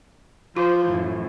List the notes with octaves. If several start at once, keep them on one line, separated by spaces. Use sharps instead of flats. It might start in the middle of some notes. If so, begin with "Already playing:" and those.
F3 F4 C5
F#2 A2 E3